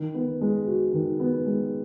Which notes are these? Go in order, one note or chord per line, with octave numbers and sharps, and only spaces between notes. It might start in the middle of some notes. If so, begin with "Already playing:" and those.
Already playing: D#3
B3
G#3
F#4
D#3
B3
G#3